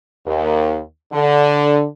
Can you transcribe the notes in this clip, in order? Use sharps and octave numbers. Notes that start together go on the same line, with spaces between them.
D#2
D3